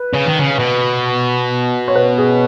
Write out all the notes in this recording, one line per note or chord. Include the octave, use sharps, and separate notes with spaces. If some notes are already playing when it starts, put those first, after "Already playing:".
Already playing: B4
C#3
D#3
C#3
B2
C#5
B4
G#4